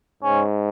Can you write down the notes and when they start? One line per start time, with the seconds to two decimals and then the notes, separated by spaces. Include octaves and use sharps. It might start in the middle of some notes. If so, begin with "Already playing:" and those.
0.23 G#2 C#4